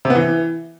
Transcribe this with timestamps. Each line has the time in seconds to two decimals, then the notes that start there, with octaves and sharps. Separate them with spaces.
0.05 C3
0.10 B3
0.15 E3